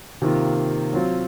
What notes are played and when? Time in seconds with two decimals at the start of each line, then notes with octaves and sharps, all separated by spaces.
0.22 C3 D#3 A#3 F4
0.93 F#3 C4 F4